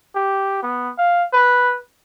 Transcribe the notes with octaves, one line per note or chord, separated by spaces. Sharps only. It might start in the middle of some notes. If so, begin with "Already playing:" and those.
G4
B3
F5
B4